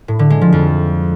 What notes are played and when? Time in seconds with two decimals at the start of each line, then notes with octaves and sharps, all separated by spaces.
0.08 A2
0.19 D3
0.30 G#3
0.41 F3
0.52 F2